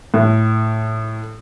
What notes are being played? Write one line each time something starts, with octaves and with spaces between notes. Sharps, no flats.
A2